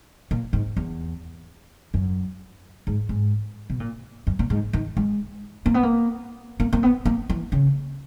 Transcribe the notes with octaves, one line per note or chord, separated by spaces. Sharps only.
A#2
G#2
E2
F#2
G#2
G#2
B2
A#2
F#2
A#2
G#2
D#3
G#3
A#3
B3
A#3
A#3
A#3
B3
A#3
E3
C#3